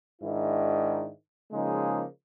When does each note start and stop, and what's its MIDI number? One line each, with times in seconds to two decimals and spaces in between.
0.22 1.09 44
0.22 1.09 51
0.22 1.09 62
0.22 1.09 64
1.52 2.03 49
1.52 2.03 53
1.52 2.03 56
1.52 2.03 58
1.52 2.03 63